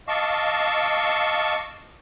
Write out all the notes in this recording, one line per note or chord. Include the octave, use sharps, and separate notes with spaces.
D#5 F5 A5 C#6 D6 E6